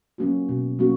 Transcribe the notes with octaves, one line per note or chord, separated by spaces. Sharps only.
F#3 A#3 C#4 F#4
B2
F#3 A#3 C#4 F#4